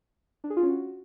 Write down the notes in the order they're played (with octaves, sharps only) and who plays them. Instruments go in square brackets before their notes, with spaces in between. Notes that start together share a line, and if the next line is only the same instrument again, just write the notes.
[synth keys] D4
G#4
F4
C#4
F#4